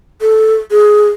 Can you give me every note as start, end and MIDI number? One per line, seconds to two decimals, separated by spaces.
0.21 0.54 69
0.71 1.08 68